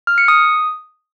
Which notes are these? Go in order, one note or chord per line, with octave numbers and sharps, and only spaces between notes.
F6
C#7
D#6